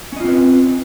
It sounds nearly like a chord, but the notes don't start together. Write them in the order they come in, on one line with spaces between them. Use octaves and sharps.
C#4 D#5 F4 C4 B4